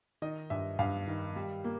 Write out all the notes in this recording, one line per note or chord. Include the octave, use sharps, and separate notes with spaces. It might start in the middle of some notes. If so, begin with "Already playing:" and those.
D#3 D#5
G2 E5
G2 F5
D#3
G3
A#3